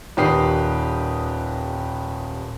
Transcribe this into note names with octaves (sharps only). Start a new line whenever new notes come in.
D#1 D#3 G4 B4 D#6 C7